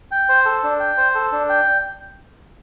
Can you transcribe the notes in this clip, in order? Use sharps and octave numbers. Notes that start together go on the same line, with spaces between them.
G5
C5
A4
D4
G5
C5
A4
D4
G5